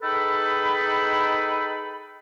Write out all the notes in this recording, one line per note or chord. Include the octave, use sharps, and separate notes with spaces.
D#4 G#4 A4 B4 G5 B5